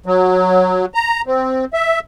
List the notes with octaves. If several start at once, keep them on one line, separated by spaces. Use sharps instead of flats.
F#3
A#5
C4
E5